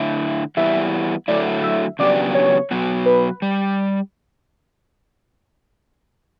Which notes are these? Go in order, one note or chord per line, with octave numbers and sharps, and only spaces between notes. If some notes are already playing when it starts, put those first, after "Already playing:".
Already playing: D3 A3 E4
E3 G3 B3 E4 E5
D3 F#3 A3 E4 D5
E5
C#3 F#3 B3 D4 G4 D5
C#5
B2 F#3 B3 F#4
B4
G3